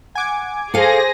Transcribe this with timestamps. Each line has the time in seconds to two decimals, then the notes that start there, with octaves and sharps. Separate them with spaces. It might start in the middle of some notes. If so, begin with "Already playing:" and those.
0.15 F#5 G#5 D6 G#6
0.74 G#4 A4 C5 F5 A#6